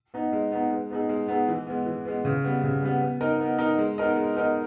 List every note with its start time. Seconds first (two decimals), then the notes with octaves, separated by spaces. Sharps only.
0.14 B3 D#4
0.33 G#3
0.52 B3 D#4
0.70 G#3
0.90 B3 D#4 G#4
1.09 G#3
1.28 B3 D#4 G#4
1.48 E3
1.67 G#3 B3
1.86 E3
2.05 G#3 B3
2.25 C#3
2.44 G3 B3
2.64 C#3
2.83 G3 B3
3.01 B3
3.21 D#4 A#4 D#5
3.40 B3
3.59 D#4 A#4 D#5
3.78 G#3
3.98 B3 D#4 A#4 D#5
4.17 G#3
4.36 B3 D#4 A#4 D#5